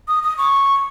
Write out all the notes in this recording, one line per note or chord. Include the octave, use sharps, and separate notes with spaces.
D#6
D#6
C#6